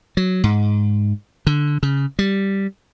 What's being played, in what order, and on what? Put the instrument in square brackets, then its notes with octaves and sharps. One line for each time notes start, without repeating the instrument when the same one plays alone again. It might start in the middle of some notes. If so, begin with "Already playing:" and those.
[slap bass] F#3
G#2
D3
C#3
G3